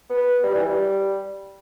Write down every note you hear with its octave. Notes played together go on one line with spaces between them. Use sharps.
B3
G3
E3
G3